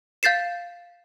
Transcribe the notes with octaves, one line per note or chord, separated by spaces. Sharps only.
F5 G6 A6 C7 E7